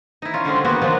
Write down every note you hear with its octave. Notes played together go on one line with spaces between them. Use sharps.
D#4 E4
C#4 F4
D3 G3 G#3 C4
A#3 B3 F#4 G4
C3 F3 F#3 G#3 B3 D4